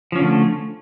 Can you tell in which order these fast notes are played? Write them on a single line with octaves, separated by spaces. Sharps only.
F3 C#4 D3 A3